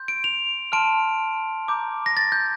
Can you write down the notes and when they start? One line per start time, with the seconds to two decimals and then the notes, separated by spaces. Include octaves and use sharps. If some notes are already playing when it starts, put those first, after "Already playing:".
Already playing: C6 G6
0.08 D7
0.24 F7
0.72 A5 C6 F6 D7
1.68 A#5 D6 G6
2.06 A#6
2.17 A6
2.32 G6